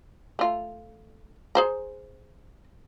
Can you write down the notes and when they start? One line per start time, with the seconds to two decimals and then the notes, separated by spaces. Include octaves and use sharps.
0.39 A3 F4
1.55 G#4 C5 A#5